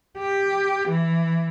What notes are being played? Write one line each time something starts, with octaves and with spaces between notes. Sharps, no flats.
G4
E3